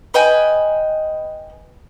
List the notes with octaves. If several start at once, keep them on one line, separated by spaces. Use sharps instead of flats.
B4 D#5 G5 G#5